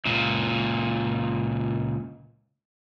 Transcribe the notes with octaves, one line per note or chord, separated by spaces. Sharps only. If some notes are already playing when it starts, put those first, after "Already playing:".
C#2 A#2